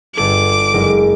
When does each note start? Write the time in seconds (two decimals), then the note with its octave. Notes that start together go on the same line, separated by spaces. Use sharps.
0.15 G1 A4 D6 G#6
0.73 F#1 G#3